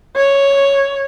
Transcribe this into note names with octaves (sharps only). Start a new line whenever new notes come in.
C#5